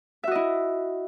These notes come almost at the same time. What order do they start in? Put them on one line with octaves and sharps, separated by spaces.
E5 F#4 D#5 E4